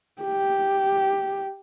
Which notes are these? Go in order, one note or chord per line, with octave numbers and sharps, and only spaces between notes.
G4